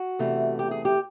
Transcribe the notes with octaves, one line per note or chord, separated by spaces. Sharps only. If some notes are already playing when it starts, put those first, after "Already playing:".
Already playing: F#4
E2 C3 E3 A3
G4
G#4
G4